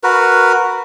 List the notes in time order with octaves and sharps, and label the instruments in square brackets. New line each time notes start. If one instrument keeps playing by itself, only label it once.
[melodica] F#4 A#4 B4